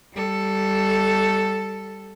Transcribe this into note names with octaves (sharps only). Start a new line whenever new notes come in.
G3 A4